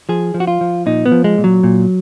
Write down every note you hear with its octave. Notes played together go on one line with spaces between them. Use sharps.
F3 G#4
F3
F#4
F4
F3
A#2 D#4
B3
F3
G#3
A#2
F#3
A#2